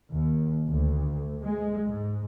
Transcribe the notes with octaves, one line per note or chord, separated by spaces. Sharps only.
D#2
D2
G#3
G#2